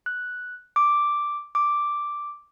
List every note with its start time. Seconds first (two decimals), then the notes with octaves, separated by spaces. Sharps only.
0.06 F#6
0.76 D6
1.55 D6